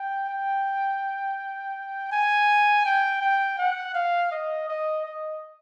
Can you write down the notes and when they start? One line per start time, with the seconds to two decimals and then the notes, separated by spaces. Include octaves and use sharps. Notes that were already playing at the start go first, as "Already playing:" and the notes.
Already playing: G5
0.29 G5
2.12 G#5
2.85 G5
3.21 G5
3.58 F#5
3.94 F5
4.31 D#5
4.68 D#5
5.05 D#5